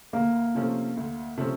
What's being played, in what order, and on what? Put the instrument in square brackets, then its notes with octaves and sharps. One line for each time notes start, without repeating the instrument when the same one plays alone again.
[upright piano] D2 [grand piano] A#3
[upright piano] C3 F3 A3 C#4
D2
C3 F3 A3 C#4